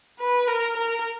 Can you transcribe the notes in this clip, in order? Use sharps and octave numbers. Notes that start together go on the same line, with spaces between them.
B4
A#4
A#4